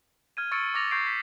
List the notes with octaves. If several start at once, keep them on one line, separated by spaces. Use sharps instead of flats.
F6 G#6 D#7
C#6 E6 A6 C#7 D7
C#6 D6 A6 A#6 F7
C#6 G6 G#6 A#6 C7 D7
B6